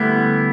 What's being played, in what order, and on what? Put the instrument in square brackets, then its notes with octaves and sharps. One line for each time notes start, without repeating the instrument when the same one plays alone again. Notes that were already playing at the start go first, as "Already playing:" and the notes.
Already playing: [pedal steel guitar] D3 G3 B3 E4 [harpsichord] A3